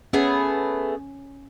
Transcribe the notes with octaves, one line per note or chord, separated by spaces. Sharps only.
A3 B3 C#4 G#4